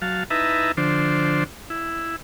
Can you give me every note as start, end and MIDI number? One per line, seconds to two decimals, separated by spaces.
0.02 0.23 54
0.02 0.23 77
0.02 0.23 81
0.30 0.72 63
0.30 0.72 64
0.30 0.72 71
0.30 0.72 76
0.30 0.72 81
0.30 0.72 82
0.77 1.44 50
0.77 1.44 53
0.77 1.44 62
0.77 1.44 72
1.70 2.16 64